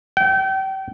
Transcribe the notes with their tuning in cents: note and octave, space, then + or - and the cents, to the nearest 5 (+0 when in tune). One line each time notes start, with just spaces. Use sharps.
G5 -35